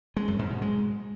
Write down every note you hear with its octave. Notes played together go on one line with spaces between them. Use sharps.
G#3
F#2
G#2
B2
G#3